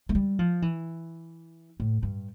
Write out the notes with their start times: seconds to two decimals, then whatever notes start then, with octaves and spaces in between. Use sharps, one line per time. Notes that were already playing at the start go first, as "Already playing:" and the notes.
0.09 A3
0.15 G3
0.39 F3
0.62 E3
1.80 A2
2.03 G2